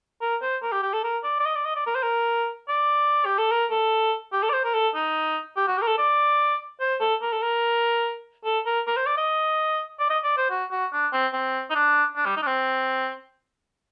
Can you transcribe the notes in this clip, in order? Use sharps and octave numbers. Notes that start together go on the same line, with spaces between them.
A#4
C5
A#4
G4
G4
A4
A#4
D5
D5
D#5
D5
D#5
D5
A#4
C5
A#4
D5
G4
A4
A#4
A4
G4
A4
D5
C5
A#4
A4
D#4
G4
F#4
G4
A#4
A4
D5
C5
A4
A#4
A4
A#4
A4
A#4
A#4
C5
D5
D#5
D5
D#5
D5
C5
F#4
F#4
D4
C4
C4
D#4
D4
D4
G3
D#4
D4
C4